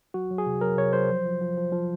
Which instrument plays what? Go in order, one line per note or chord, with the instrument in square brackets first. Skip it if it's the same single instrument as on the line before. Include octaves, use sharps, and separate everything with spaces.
[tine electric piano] F#3 F#4
F#3
G#4
C3
F#3 A#4
C3 C#5
F#3 C5
F3
F3
F3
F3
F3